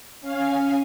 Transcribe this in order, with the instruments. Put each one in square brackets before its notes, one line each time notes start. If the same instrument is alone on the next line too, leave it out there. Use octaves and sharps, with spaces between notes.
[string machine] C#4 F5 G#5